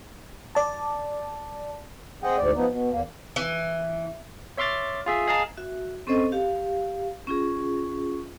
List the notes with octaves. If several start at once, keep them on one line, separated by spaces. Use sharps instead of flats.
D5 A5
C4 G#4 D#5 F#5 G5
D2 G#2 D5
F3 B3 D#4
B2
E2 A#3
E3
C#5 E5 C6 D6 F6 A6
F4 G#4 E5
G#4 D#5 F5 A5 A#5
F#4 E5
C4 C#4 A4 C5 D#5
G4 F5
C#4 F4 G#4